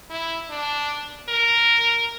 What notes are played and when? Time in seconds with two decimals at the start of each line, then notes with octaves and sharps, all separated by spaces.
0.10 E4
0.50 D4
1.29 A#4